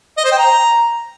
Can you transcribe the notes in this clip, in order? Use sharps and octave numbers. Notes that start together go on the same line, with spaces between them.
D#5
C5
G5
A#5